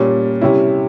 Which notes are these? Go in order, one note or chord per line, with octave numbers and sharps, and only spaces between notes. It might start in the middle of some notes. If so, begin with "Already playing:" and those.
Already playing: A#2 G3 C#4
C3 G3 C#4 E4